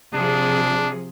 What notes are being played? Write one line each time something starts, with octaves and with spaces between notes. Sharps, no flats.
C3 F3 D4 G#4